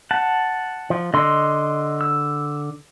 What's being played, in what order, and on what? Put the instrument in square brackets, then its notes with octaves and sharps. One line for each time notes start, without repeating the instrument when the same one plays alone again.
[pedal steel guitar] F#5 A5
[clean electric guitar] F3
[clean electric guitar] D3 [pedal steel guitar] D#5 C6
[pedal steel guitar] E6